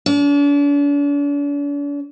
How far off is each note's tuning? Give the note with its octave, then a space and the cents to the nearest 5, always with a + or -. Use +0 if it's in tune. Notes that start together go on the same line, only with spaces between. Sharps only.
D4 -45